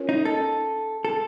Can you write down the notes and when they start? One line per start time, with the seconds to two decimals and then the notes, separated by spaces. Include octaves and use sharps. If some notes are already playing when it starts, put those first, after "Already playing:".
Already playing: C#4 F4 A#4 C#5
0.09 D#4
0.25 A4
1.05 A4